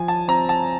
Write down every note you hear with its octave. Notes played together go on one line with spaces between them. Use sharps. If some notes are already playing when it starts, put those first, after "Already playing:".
Already playing: F3 G#5
A5
C4 A#5
A5